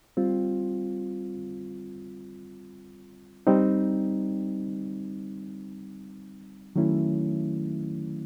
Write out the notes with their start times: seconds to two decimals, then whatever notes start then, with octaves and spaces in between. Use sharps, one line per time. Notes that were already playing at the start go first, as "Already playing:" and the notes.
0.17 G3 C4 F4
3.47 G3 C4 D#4
6.76 D#3 F#3 A3 C#4 E4